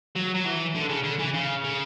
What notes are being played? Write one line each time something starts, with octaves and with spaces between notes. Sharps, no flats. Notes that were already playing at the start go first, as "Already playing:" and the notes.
F#3
F#3
E3
D3
C#3
D3
E3
C#3
C#3